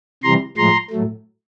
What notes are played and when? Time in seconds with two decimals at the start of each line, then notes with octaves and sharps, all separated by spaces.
0.23 C3 E3 G3 A#5 C6
0.57 A2 F3 G#3 A#5 C6
0.91 A2 F#3 A3